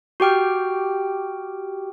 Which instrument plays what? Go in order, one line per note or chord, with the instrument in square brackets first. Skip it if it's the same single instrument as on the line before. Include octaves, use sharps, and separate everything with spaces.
[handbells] F#4 G4 G5 F6